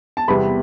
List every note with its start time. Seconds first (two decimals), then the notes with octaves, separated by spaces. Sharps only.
0.17 A5
0.28 E2 C3 G3 B3 B5